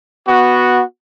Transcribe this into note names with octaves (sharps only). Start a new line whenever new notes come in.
B3 F#4